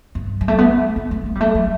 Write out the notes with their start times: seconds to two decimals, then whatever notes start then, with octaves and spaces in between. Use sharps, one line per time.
0.15 G2
0.41 G3
0.48 A3
0.58 B3
0.70 A3
0.96 B3
1.11 A3
1.26 B3
1.35 G3
1.41 A3
1.55 F#3